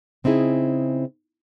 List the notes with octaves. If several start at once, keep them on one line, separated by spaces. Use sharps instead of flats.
C#3 C4 D#4 E4 G#4